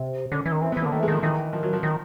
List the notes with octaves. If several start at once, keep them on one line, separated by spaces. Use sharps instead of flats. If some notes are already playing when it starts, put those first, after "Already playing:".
Already playing: C3
D3 C#4
E3
D#3
E3 C4
B3
E3
A#3
D3
D#3 A3
E3
G#3
D#3 F3
D#3 E3
F3
F#3
F3
D#3